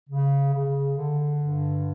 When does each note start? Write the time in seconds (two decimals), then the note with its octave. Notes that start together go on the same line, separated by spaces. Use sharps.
0.10 C#3
0.53 C#3
0.97 D3
1.41 G2